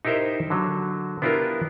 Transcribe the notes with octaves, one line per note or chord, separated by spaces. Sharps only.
D#4 E4 G4 A#4 C5 E5
D3 F#3
B3 D4 E4 F4 G4 A#4